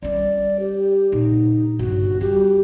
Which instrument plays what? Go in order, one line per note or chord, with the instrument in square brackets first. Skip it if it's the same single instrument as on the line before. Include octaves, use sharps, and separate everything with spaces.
[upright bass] G3 C#4 [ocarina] D5
[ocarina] G4
[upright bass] A#2 C#3 [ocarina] D#4
[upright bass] G1 C#3 [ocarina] F#4
[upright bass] G3 [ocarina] G4